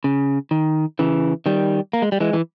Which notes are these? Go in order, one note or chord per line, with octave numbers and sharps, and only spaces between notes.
C#3
D#3
C#3 E3
D#3 G3
A#3
G#3
G3
E3 G#3
E3